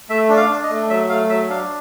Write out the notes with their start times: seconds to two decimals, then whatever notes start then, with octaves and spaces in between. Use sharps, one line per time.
0.09 A3 E5
0.29 D4
0.36 F5
0.50 D4
0.63 D#5
0.70 A3
0.90 F#3 E5
1.09 A3 F5
1.29 F#3 E5
1.50 D4 F5